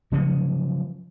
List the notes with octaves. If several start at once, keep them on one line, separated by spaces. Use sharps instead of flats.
C#3 F3 F#3 C#4